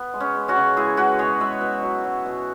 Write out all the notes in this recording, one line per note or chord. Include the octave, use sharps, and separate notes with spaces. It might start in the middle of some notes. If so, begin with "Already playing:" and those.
Already playing: B3
G#3
C#4
G#3
C#4 F#4
C#3
G#3 E4 G#4
G#3 F#4 B4
B2 G#4 C#5
G#3 B4 E5
B2
F#3
F#3
B2